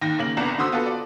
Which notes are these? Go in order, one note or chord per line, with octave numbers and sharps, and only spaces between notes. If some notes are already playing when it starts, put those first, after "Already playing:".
D#2 D#3 A#6
C#3 A#3 F#7
G1 C2 B3 D4 A#5 E7
D3 F#4 C5 D#6 E6
B3 F4 F#4 A4
D5